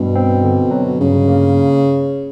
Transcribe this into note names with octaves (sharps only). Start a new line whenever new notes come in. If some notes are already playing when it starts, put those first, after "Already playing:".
Already playing: G2 B2
C4
D3
F#3
G2 C#3
A#3